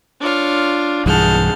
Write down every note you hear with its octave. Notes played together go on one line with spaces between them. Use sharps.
D4 F4 C#5 F6
B1 G2 E3 G#4 F#5 A5 F6 G6